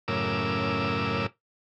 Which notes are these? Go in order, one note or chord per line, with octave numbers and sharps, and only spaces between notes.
F#2 A2 C#3 A#4 D6 E6